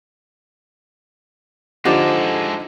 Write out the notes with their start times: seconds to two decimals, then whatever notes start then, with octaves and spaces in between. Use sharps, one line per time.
1.85 D3 F3 G#3 D4 D#4 G4 A4